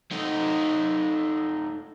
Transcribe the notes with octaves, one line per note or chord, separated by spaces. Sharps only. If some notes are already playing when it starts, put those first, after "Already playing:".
A3 D#4